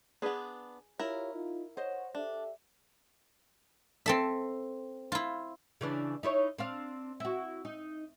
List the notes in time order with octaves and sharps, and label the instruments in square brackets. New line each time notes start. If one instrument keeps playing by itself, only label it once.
[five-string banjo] B3 D4 [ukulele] G#4 B4
[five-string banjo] E4 A#4 [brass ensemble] F4 G4 C#5
[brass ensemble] D#4 F4
[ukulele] C5 D#5 [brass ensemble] C#5 F#5
[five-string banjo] D4 [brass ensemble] G4 A4 E5
[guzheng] C4 A4 E5
E4 F4
[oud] C#3 E3 D4
D#4 E4 C#5
C4 D4 F5
E4 F#4
D#4